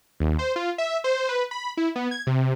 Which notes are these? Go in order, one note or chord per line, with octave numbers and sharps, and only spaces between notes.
D#2
C5
F4
E5
C5
B4
B5
E4
B3
G#6
C3